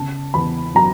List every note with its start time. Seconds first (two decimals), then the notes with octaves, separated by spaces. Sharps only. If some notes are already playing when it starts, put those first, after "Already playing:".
Already playing: C#3 A5
0.34 E2 B5
0.75 F#3 A#5